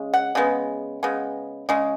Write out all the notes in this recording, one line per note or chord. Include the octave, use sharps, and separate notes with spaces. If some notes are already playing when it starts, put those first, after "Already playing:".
Already playing: C#3 G#3
F#5
C#3 G#3 B3
C#3 G#3 B3
C#3 G#3